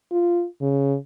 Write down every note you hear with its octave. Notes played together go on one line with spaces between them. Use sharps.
F4
C#3